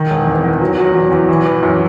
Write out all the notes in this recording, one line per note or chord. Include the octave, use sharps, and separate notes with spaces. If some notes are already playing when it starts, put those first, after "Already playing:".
Already playing: D#3
E1
E2
E2
F#3
F#3
E2
E2
E3
E3
F#2